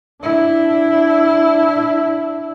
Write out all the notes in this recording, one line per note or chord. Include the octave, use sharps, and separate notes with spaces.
D4 E4